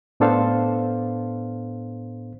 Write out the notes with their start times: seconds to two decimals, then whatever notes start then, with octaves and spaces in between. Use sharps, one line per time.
0.20 A2 B3 D4 A4 C5 F5